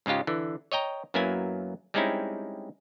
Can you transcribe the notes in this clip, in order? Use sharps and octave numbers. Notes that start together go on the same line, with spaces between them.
G#2 C#3 G#3 F4 G4
D3 E3
C#5 D#5 G5 A#5
F#2 F#3 A#3 B3 E4 G#5
G3 G#3 C4 C#4 D#4 E4